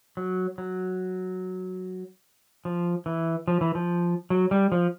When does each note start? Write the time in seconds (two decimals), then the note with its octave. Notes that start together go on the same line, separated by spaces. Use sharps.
0.17 F#3
0.58 F#3
2.65 F3
3.06 E3
3.48 F3
3.61 E3
3.75 F3
4.30 F#3
4.51 G3
4.72 F3